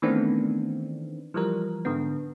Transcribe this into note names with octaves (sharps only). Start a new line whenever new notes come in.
D#3 E3 A3 B3 C4 D4
E3 F3 G3 A#4
G#2 D3 B3